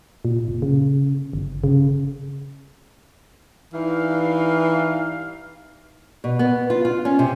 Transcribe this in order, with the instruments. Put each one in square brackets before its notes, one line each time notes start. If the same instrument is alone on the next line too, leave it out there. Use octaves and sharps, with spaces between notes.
[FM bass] A#2
F#1
C#3
G1
C#3
[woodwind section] G2 D#4 F5 [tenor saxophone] E3
[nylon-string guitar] B2
B3
F4
F4
C#4
C3